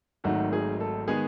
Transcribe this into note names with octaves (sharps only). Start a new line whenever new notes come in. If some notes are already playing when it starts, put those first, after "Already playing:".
G#1 G#2 D#3 F#3 A3 F#4
G#4
A4
D#3 G#3 B3 G#4